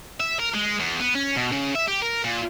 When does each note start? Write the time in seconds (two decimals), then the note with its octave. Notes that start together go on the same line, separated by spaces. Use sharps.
0.20 E5
0.40 A#4
0.54 G#3
0.80 E2
1.00 B3
1.15 C#4
1.36 B2
1.52 C#3
1.75 E5
1.88 G4
2.02 A#4
2.24 A#2